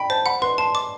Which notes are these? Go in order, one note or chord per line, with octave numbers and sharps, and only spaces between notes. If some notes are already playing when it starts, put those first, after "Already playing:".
Already playing: G5 B5
C5 A5
F#5 B5
B4 C6
A5 C6
D6